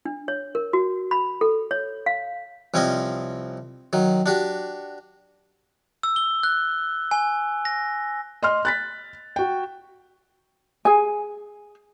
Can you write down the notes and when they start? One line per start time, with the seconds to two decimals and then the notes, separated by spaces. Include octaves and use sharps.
0.05 D4
0.28 C#5
0.55 A#4
0.73 F#4
1.11 B5
1.41 A4
1.71 C#5
2.06 F5
2.74 C2 F3 C4 C#4 D#5
3.93 D#3 F#3
4.26 D4 F#4 G4
6.03 E6
6.16 G7
6.43 F#6
7.11 G#5
7.65 A#6
8.43 D#5 C6 F6
8.65 F#6 A6 B6
9.36 F#4 G5
10.85 G#4 G#5